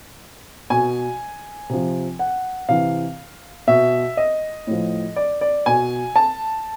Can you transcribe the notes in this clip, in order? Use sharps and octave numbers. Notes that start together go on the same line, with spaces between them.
B2 G#5
C3 F3
F#5
C3 E3 F5
B2 E5
D#5
A2 F3
D5
D5
B2 G#5
A5